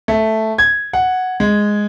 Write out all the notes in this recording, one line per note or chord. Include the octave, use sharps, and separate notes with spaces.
A3
G#6
F#5
G#3